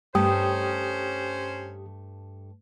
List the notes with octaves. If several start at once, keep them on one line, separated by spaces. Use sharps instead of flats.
G2 A3 C#4 G4 C5 G5 A5 D#6